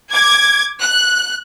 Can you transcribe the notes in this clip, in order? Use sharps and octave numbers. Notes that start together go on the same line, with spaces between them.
D6 G#6
F#6